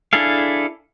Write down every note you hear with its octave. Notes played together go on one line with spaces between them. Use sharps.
D4 E4 G#4 A4 F5